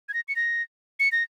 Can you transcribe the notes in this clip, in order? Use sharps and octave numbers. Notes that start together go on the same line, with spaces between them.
G#6
A#6
C#7
A#6
C#7
A#6